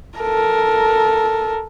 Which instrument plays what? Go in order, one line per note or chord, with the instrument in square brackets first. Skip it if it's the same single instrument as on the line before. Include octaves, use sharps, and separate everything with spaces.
[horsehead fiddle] A4 A#4